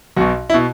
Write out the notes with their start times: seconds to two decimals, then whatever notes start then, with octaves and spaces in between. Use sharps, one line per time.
0.17 B1 B2 F#4
0.50 E4
0.54 B2